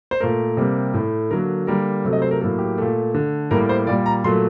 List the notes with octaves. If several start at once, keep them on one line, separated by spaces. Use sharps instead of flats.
C5
A#2 A3 A#4
C3 G3 A#3
A2 A3
D3 F#3 A#3 A#4
D3 G3 A#3 A#4
C3 F#3 A3 A4
D#5
C5
A#4
A2 F#3 A#3 A4
G4
A#2 A3
D3 A3
A2 G3 A#3 A#4
C5
A#2 G3 A#3 D5
A#5
A#2 F#3 A3 C6